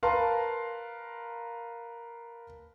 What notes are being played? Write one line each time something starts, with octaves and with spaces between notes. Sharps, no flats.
A#4 B4 F5 A5 A#5 C6